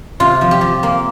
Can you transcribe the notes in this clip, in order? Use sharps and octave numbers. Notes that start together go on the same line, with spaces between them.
C3 F4
F3
G4
F3
A#3